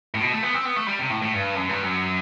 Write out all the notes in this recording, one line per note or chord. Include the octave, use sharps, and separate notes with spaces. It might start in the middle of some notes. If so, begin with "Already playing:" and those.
A2
B2
A3
B3
C4
B3
A3
G3
C3
A2
A2
G2
F#2
G2
F#2